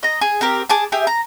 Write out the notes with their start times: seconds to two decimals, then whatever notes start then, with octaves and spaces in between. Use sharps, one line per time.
0.03 D#5 A#5
0.21 G#4
0.41 C4 G4 A#4
0.70 G#4 A5 D6
0.92 G4 G#4 E5
1.07 A#5